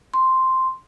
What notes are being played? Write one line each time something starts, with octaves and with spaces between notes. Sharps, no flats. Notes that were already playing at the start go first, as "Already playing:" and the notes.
C6